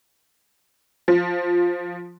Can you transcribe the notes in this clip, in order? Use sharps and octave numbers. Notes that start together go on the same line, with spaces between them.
F3